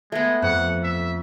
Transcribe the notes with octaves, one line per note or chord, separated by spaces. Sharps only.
G#3 A3 B3
F2 F#5
E5